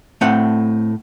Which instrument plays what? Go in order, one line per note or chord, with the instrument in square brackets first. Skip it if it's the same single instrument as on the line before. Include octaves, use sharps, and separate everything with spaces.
[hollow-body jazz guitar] A2 A3 C4 F#5